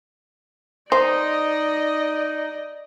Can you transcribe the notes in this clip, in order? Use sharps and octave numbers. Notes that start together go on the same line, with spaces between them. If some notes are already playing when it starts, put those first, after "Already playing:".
D#4 C5 D5 D#5